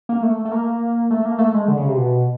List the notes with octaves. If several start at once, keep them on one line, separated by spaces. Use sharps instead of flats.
A#3
A3
A3
A#3
A3
A#3
A3
G#3
D3
C#3
C3
B2